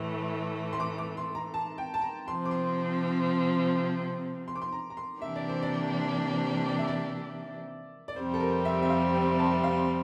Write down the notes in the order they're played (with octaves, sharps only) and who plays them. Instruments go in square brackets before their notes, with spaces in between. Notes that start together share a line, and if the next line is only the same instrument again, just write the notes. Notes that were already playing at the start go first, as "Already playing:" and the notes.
Already playing: [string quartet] A2 E3 A3
[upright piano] C6
D6
D6
C6
A#5
A5
G5
A5
A#5
[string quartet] C3 F3 C4 [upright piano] C6
[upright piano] D6
C6
C6
D6
C6
A#5
A#5
C6
[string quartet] C3 E3 A#3 D4 G4 [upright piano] E5
[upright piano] D5
C5
D5
D5
E5
D5
D5
[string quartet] F2 C3 G3 C4 [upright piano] C5
[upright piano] A4
A#4
E5
E5
F5
G5
A5
F5